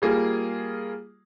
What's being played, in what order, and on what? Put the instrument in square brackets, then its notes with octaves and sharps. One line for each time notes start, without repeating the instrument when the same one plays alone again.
[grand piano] G3 A#3 F4 G#4